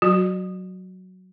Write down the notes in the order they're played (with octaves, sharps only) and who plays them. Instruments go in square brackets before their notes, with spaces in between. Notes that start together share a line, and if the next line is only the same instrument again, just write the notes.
[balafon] F#3 F#4